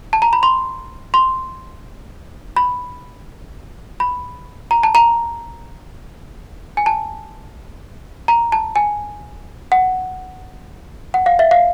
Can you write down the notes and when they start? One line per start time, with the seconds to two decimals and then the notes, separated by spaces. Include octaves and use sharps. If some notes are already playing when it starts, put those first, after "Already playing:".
0.13 A5
0.22 A#5
0.33 B5
0.43 C6
1.14 C6
2.56 B5
4.00 B5
4.71 A#5
4.83 A5
4.95 A#5
6.77 G#5
6.86 A5
8.28 A#5
8.52 A5
8.76 G#5
9.72 F#5
11.14 F#5
11.26 F5
11.39 E5
11.51 F5